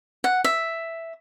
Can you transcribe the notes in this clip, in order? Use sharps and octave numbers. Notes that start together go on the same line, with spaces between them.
F#5
E5